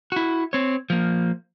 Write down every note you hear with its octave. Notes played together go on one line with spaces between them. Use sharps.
E4 F#4
C4 C#5
F3 A#3